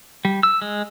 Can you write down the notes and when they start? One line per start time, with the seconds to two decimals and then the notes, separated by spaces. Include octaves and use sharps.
0.25 G3
0.43 E6
0.62 G#3